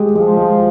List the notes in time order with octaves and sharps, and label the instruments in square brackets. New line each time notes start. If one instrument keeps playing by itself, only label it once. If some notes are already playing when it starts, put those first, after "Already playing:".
Already playing: [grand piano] G#3 G4
[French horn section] F3 [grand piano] G#3
[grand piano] G#3